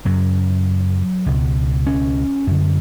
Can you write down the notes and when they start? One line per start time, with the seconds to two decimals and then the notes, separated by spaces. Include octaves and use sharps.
0.05 F#2 C#3 F#3
1.26 C#2 B2
1.87 C#4
2.47 F#2 D3